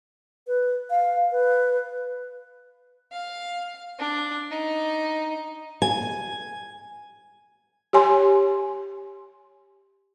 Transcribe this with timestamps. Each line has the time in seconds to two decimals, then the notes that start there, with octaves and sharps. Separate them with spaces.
0.47 B4
0.90 F5
1.31 B4
3.12 F5
3.99 D4
4.51 D#4
5.82 G#5
7.93 G4 C#5 G#5 C6